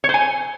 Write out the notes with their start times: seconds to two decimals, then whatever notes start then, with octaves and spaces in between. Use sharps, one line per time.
0.04 C#5
0.09 C5
0.14 G#5